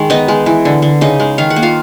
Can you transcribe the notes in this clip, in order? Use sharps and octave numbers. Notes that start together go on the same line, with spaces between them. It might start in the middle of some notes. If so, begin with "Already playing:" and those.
Already playing: D#3 G#3
B3 D#4 D#5
G#3
E3
D3
D3
C#3 D#4 D#5
G#3
D#3 F5
F#5
A#3
F4 F5